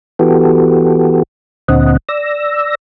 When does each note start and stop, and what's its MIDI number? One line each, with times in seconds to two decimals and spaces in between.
0.19 1.23 52
0.19 1.23 59
0.19 1.23 66
0.19 1.23 67
0.19 1.23 69
1.68 1.97 38
1.68 1.97 46
1.68 1.97 50
1.68 1.97 60
1.68 1.97 75
1.68 1.97 78
2.09 2.75 74
2.09 2.75 88
2.09 2.75 94